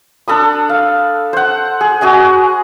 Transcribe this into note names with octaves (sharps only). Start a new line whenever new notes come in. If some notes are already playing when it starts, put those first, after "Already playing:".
D4 A4 B5 D#6
F5
C5 F#5
G#4
F#4 G#4 D#5 G#5